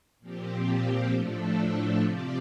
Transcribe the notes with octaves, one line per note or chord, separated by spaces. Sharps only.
A#2 F3 C4 G4
A2 F3 A3 D4 A4
C3 F3 C4 G4 D5